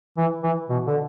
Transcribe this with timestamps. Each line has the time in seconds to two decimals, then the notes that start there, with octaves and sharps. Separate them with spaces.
0.18 E3
0.44 E3
0.69 B2
0.87 D3